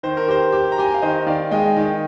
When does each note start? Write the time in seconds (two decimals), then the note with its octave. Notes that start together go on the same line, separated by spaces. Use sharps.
0.03 D#3 C5
0.17 A#4
0.28 G4 C5
0.52 G4
0.72 A#5
0.78 G4 G#5
0.87 G5
0.94 F5
1.02 D#3 C5 D#5
1.26 D#3 D5 F5
1.51 G#3 D#5 G5
1.77 D#3